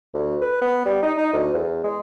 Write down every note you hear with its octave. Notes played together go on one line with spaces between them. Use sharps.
D2
B4
B3
G3
D#4
D#4
D2
E2
G#3